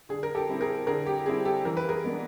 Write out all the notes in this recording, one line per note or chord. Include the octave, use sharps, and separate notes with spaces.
D3 G#4
A#4
G4 A4
G3 C4 E4
G#4 A#4
D3 G#4 A#4
G4
G3 C4 E4 G#4
G4 A4
E3 A#4
B4
G#4 A#4
G#3 B3 D4